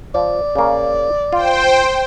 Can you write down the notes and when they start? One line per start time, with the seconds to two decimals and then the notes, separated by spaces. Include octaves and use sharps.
0.15 F3 D5
0.55 C#3 A#3
1.33 F4 C5 G5